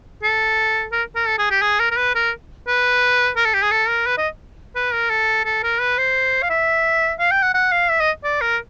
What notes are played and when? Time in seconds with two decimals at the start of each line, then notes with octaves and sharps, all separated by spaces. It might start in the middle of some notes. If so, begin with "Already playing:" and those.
0.23 A4
0.92 A#4
1.16 A#4
1.27 A4
1.39 G#4
1.51 G4
1.62 G#4
1.80 A#4
1.91 A#4
1.97 B4
2.15 A#4
2.67 B4
3.36 A#4
3.45 A4
3.54 G4
3.63 G#4
3.71 A4
3.89 A#4
4.06 B4
4.18 D#5
4.75 B4
4.93 A#4
5.10 A4
5.45 A4
5.63 A#4
5.80 B4
5.98 C5
6.42 F5
6.50 E5
7.19 F5
7.31 G5
7.43 F#5
7.54 F#5
7.72 F5
7.89 E5
8.01 D#5
8.24 D5
8.41 A#4